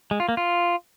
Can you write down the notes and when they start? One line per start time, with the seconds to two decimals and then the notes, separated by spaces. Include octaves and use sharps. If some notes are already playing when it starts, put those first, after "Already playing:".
0.11 G#3
0.20 F4
0.29 A#3
0.37 F4